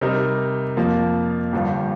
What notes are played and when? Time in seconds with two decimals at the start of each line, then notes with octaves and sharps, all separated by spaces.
0.01 C3 G3 D#4 A#4
0.77 F2 F3 A#3
1.53 G1 G2 F3